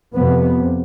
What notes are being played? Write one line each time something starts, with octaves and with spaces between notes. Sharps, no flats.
F2 C3 B3